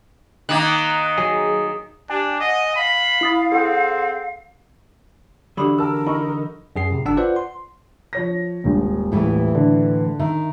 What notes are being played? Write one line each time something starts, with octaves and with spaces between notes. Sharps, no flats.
D#3 A#3 F#6
F#3 G#4
D4 G4 G#5
D#5 F#5
F5 B5
E4 D#6 A6
C4 G#4 A4 F#5
D3 E3 F#3 D4 G4 B5 D#6
A#4 A5 E6
D#4 B5 C#6
F#2 G#4 C7
A2 C3
G1 D4 F#5 A5 E6
F4 B4 C5 D5 F#5
C6
F3 C#5 A#6
D#1 G#1
A2 E3 A3
D3
D#3 E5